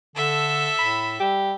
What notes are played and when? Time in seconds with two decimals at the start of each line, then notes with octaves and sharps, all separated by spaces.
0.16 D3 A4 E5
0.79 A2 B5
1.20 G3 G4